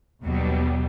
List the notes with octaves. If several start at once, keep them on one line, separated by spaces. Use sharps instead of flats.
D#2 B2 F#3 G3